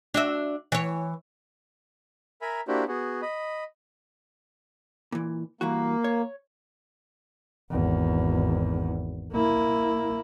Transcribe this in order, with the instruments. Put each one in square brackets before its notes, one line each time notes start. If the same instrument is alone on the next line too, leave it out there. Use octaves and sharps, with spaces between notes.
[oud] D4 F#4 E5
E3 C#5
[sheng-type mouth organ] A#4 E5 G#5 A#5 B5
A#3 D4 E4 F#4 G4 C5
B3 F#4 G#4
D#5 B5
[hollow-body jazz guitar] A#2 E3
[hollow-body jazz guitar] G2 E3 F#4 [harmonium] A#3
[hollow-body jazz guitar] C#5
[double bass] G#1 E2
A#3 E4